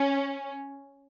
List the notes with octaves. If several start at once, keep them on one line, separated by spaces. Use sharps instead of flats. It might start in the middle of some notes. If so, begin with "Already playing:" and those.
Already playing: C#4